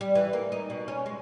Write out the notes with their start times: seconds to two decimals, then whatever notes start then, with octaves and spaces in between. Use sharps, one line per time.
0.01 G3
0.15 E3
0.33 A#3
0.52 D#4
0.70 B2
0.88 C#4
1.06 G#3